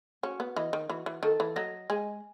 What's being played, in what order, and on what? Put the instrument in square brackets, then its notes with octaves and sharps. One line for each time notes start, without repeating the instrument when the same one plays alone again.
[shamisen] C#4 [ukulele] F#4
[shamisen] B3
[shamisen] E3 [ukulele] D#5
[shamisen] D#3
[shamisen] E3 [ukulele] F#4
[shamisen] E3
[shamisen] D#3 [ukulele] A4
[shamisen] E3
[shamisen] F#3 [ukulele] D#5
[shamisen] G#3 [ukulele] G#5